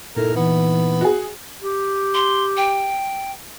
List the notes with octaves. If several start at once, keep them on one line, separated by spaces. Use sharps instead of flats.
A#2 D#4 E4 A4 A#4
E3 B3
F#4 G#4
G4
C6
G5